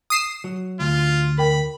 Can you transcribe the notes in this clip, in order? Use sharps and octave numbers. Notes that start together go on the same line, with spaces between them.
D#6 C7 E7
F#3
D2 F4
A#4 G5 B5